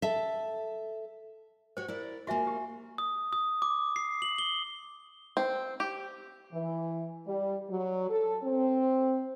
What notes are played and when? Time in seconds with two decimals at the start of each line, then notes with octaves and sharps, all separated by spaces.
0.02 A4 E5
1.77 F#4 G4 C5 C#5
1.88 E4 A#4 D5
2.27 A#3 F4 F#4 E5 G#5
2.47 G4
2.98 D#6
3.33 D#6
3.62 D6
3.96 C7
4.22 F#7
4.38 G7
5.37 C4
5.80 G4
6.53 E3
7.28 G3
7.71 F#3
8.10 A4
8.44 C4